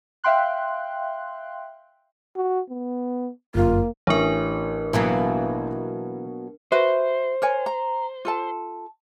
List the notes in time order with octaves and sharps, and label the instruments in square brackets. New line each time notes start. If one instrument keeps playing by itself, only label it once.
[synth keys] E5 F5 G5 C6 F#6
[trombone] F#4
B3
[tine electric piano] G1 F#2 [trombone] A#3 [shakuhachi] F4
[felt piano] A1 E5 [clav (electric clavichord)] C#4 [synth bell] D4 A#4
[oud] B2 F#3 A#3 [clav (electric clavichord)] E3
[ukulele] F#4 B4 E5 [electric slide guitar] C5
[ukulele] A#4 C#5 G#5
A#5
F4 A4 A5